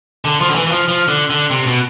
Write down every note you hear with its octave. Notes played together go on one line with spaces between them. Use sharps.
D3
F3
D3
E3
E3
F3
F3
D3
D3
C3
B2